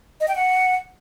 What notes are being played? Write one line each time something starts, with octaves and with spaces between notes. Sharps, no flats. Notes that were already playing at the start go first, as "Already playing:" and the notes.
D#5
G5
F#5